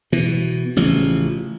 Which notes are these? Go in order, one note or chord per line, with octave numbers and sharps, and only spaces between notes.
B2 E3
A1 C#3 F3